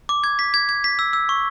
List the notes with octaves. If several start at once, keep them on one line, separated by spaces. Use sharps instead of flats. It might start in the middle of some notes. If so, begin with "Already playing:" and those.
D6
G#6
B6
G#6
G#6
B6
E6
E6
C#6